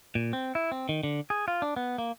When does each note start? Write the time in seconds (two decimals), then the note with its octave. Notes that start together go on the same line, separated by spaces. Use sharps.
0.15 A#2
0.33 C4
0.55 E4
0.72 C4
0.89 D#3
1.03 D3
1.30 G#4
1.48 F4
1.62 D4
1.76 B3
1.98 A#3